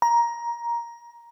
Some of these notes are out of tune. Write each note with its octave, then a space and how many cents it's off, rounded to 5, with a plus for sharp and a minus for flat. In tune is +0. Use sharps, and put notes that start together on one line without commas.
A#5 +15